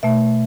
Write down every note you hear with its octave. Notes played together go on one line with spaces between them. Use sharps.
B2 A3 E5